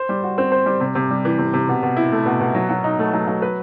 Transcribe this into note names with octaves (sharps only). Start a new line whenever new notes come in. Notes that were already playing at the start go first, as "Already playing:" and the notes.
Already playing: C5
G3
F#4
C4
C5
G3
C3
C3
G3
E3
C3
C3
B2
B2
E4
A3
B2
B2
F#3
F#3
D#4
A3
F#3
F#3
B4